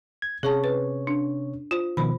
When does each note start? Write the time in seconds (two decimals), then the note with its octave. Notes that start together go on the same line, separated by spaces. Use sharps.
0.22 G#6
0.43 C3 C#4 G#4 C#5 A5
0.64 B4
1.07 D4
1.71 F4 C5
1.97 B2 D#3 F3 C5 B5